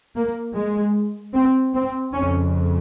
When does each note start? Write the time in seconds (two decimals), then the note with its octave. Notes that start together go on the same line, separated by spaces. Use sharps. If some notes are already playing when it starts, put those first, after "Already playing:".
0.16 A#3
0.55 G#3
1.34 C4
1.74 C4
2.13 F2 C#3 C#4